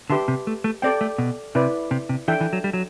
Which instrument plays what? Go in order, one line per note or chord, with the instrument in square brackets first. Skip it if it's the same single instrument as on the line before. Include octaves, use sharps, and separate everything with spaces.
[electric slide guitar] D3 [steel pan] G4 B4 E5 A5 C6
[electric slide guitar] C3
A3
A3
[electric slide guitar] C4 [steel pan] A4 D5 G5
[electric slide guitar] A3
B2
[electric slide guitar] C3 [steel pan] E4 B4 D5
[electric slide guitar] C3
C3
[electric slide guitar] E3 [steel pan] D4 A4 E5 G5
[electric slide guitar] E3
F#3
G3
F#3